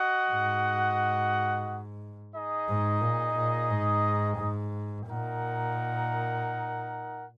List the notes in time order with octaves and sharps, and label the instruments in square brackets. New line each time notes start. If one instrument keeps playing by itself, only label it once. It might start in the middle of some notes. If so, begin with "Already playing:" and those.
Already playing: [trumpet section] F#4 D#5 F#5
[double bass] G#2
[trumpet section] D#4 G#4 D#5
[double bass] G#2
A#2
A#2
G#2
G#2
[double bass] A#2 [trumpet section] D#4 A#4 F#5